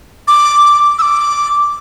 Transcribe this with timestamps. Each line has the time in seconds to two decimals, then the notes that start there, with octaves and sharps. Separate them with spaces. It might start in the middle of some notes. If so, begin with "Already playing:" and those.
0.28 D6
0.99 E6
1.02 D6